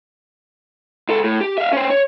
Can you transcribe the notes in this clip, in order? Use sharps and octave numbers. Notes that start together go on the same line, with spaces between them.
C#2 A4
A2
G4
E5 F5
C#4 C5
C#5